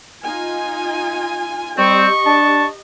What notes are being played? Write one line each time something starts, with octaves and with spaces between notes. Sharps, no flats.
D#4 F4 G#5
G3 C4 G4 D#5 C#6
D4 A5